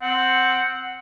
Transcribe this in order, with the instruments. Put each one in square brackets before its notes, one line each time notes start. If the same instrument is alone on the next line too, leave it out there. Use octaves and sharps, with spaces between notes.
[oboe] C4 [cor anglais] F#5